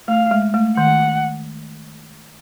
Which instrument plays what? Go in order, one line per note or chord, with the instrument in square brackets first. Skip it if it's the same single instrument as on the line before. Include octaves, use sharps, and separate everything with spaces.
[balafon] A3 [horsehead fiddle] F5
[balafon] G#3
A3
[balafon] D#3 [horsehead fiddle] F#5